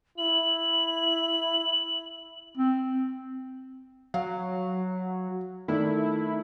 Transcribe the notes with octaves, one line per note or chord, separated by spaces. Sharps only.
E4 F#7
C4
F#3 F5
D#3 A3 D4 E4